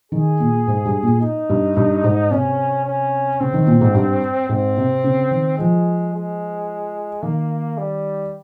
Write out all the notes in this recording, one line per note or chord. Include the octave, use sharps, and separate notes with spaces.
D#3 G#4
A#2
G#2
G2
A#2
D#4
G2
G2
G#2
C3 C#4
C#4
C#3 C4
D#3
A#2
G#2
G2
G#2 C4
C3
C#3
D#3
F3 G#3
G#3
D#3 A#3
G3